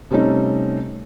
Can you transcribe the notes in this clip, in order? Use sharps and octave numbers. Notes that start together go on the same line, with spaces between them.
C3 G3 A3 C#4 D#4